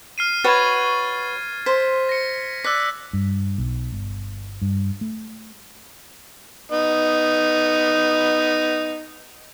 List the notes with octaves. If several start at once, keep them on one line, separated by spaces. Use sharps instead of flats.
F6 C7 D#7
F#4 B4 C#5 G#6 A6
C5 B6
A#6 C#7
D5 E6 F#6 B6
G2
B1
G1
G2
A3
B3 D#4